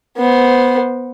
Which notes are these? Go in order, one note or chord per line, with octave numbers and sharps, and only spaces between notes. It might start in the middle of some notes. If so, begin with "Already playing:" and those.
B3 C5